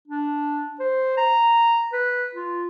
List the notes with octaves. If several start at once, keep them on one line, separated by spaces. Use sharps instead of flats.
D4
C5
A#5
B4
F4